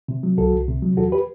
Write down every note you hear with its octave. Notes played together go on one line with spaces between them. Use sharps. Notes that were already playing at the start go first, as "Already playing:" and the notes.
C3
F#3
C2 F#4 A4
C2
C3
F#3
E2 F#4 A4
G4 B4